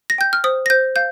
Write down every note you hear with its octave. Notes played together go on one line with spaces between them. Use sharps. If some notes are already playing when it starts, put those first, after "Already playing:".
A#6
G5 G6
F6
C5 D#6
A#6
C5 G6
F5 G6